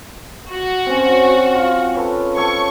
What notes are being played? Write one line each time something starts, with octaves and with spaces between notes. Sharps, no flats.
F#4
C4 C#4
F4
A4 B4 C#5
A4 C#5 G5 C#6